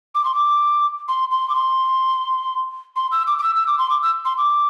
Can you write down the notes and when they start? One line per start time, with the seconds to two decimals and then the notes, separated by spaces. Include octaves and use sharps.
0.15 D6
0.25 C6
0.34 D6
1.08 C6
1.31 C6
1.50 D6
1.55 C6
2.96 C6
3.12 E6
3.27 D6
3.38 D6
3.43 E6
3.56 E6
3.67 D6
3.79 C6
3.90 D6
4.03 E6
4.25 C6
4.38 D6